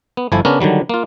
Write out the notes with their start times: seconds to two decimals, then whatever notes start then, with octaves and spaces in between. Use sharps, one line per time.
0.17 B3
0.32 G1 F3 E4 A4 G#5
0.45 C#3 B3 C#4 D4 A#4
0.60 D3 D#3 F#3 G3
0.90 A#3 F4